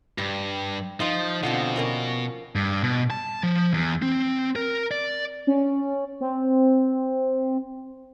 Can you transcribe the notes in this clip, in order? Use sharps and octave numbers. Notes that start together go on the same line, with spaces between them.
G2 G3
F3 D#4 F4 D#5
B2 D3 F3 C4
A#3 C#4 A#4
G2
B2
A5
F3
E2
C4
A#4
D5
C#4
C4